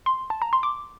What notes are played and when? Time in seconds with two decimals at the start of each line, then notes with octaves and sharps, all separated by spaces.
0.06 C6
0.30 A5
0.42 A#5
0.53 C6
0.63 D6